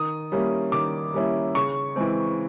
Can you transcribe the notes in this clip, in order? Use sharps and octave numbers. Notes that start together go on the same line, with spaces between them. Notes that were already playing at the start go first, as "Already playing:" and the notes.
Already playing: D#3 D#6
G3 A#3 C#4 E4
D#3 D6
G3 A#3 C#4 E4
C#3 C#6
E3 G#3 C4